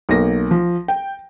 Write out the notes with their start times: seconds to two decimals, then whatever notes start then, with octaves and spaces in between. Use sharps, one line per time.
0.09 B1 A#3 A#6
0.51 F3
0.88 G5